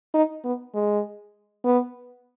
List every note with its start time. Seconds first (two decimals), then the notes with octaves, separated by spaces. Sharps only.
0.14 D#4
0.44 B3
0.75 G#3
1.65 B3